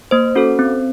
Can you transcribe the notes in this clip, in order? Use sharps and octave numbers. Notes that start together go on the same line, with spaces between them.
A#3 C5
C#4 F#4 A4
C4